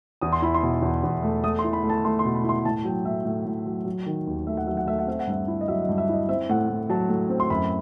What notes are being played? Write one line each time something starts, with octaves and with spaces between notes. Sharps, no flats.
E2 D#6
C6
E4 B5
C6
B2
E2
E2
A3
A3 D#6
C6
E4
B5
A3
A5
A3 C6
C6
B2
B5
E4
C6
A2 A5
F#3 G5
A2 E5
A2
A2
F#3
F#3
D#3
D#2
A3 E5
F#5
F#3 E5
F#5
A3 E5
F#5
C4 E5
F#5
G2 E5
E4
D#5
F#3 E5
D#5
G2
E5
E4 D#5
C4 E5
A2 F#5
A2
F#3 A5
A2
C4
C6
F#2 B5